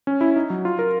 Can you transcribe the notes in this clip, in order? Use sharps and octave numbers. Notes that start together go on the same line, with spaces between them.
C#4
E4
D#4
F#3
F4
A#4